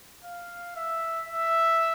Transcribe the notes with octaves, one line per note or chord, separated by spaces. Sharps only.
F5
E5
E5